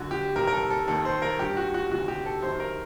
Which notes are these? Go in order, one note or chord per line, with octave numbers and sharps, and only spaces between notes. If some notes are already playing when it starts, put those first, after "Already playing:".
Already playing: F#2 D3 F#4
G4
C2 C3 D#3 A#4
A#4
A4
A4
D#2 D#3 A4
C5
A#4
G2 D#3 G4
F#4
F#4
D2 C3 D#3 F#4
G4
A4
F#2 D#3 C5
A#4